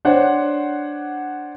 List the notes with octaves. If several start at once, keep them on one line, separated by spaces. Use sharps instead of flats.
D4 C5 C#5 F#5